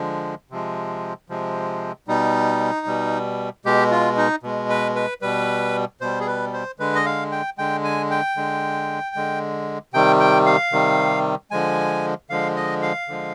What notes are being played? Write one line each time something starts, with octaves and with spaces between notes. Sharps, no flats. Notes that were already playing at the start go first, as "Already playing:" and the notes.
Already playing: D3 F3 G#3
C3 F3 G#3
C3 F3 G#3
B2 G3 D#4
B2 G3
B2 G#3 G4
F4
D#4
B2 G#3
B4
B4
B2 G3 B4
B2 G3 C5
G#4
B4
C5
D3 G#3 B4
D#5
F5
G5
D3 G#3 G5
G#5
G5
D3 G#3
D3 G#3
C3 D#3 G3 G5
G5
F5
C3 D#3 G3
D3 F3 G#3 G#5
D3 F3 G#3 F5
D#5
F5
D3 F3 G#3